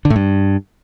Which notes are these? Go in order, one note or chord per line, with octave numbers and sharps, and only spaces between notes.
D3
A2
G2